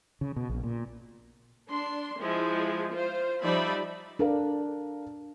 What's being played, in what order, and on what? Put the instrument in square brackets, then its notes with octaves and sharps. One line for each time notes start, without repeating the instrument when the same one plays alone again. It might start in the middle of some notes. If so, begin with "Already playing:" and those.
[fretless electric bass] C#3
B2
A#1
A#2
[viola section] D4 C6
F3 G#3 E4
F4 C5
F3 G3 D#4 D5 E5 B5
[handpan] D4 [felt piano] A4 A#4 F5